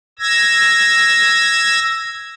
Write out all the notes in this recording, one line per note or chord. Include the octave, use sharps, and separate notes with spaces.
E6 G#6 A#6